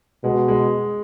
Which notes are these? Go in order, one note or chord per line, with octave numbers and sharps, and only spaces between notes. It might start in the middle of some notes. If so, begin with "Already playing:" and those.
B2 G#3
G#3